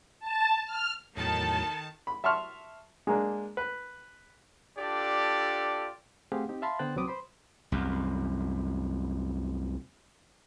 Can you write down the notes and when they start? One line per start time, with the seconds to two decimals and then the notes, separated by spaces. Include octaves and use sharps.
0.20 A5
0.65 F6
1.17 E2 A2 D#3 F#3 A4 A5
2.07 B5
2.24 E5 A5 C6 C#6 F6
3.07 G#3 A#3 D4
3.57 B4
4.77 D4 F4 G4 A4 D5
6.32 A3 C4 G4 G#4 F5 F#5
6.49 C4 D#4 G4
6.62 E5 F5 A5 B5 C6
6.79 D3 B3 C5 G5 F#6 A6
6.96 C2 F#3 C4 B4 D6 D#6
7.08 C5 B5 C6
7.72 C2 F#2